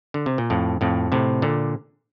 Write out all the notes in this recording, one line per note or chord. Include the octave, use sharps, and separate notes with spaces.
D3
C3
A#2
F2 A2
F2 A2
A2 C3
A#2 D3